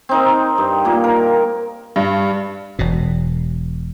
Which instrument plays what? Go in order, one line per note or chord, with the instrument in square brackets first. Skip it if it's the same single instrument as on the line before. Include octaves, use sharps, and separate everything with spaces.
[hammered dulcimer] C4 D#4 A#4
G2
A#2 A#3
A#4
[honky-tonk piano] G2
[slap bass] E1 B2